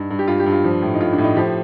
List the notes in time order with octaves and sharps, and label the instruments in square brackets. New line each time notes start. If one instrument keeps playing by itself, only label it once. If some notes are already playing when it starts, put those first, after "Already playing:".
Already playing: [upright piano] G2 D#4
G2
G4
G2 F4
G4
G2
F4
F3
A2
D#4
A2 F4
D4
A2
D#4
F3 G4